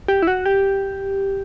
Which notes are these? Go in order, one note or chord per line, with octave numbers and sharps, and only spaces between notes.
G4
E4
F#4
G4